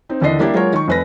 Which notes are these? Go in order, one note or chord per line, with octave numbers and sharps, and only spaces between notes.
C4 D#4
D#2 D3 E3 D5 D#5 C7
G3 A#3 D4 E4 G4
F#3 G#3 F4 F#4 A#4 C#5
D#3 C#6
F1 B4 A#6